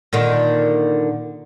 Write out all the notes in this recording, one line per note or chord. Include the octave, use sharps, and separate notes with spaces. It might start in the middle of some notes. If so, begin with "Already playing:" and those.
A#2 D3 D#3